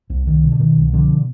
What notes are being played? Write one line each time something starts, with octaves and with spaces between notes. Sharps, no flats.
C2
C2 D#3
B2
D3
B2 D#3
C2
B2 D3 F3